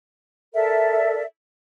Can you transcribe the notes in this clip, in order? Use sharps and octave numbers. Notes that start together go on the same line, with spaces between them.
A4 A#4 D5 E5